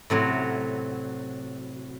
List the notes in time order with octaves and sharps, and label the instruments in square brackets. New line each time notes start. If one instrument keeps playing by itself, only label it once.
[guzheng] A2 C3 F#3